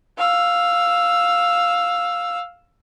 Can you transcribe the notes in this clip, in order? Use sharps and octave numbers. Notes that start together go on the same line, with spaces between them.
F5 E6